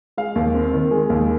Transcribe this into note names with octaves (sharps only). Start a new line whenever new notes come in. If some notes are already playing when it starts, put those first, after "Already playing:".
G#3 F5
D#2
C4
D#3
G#3
D#2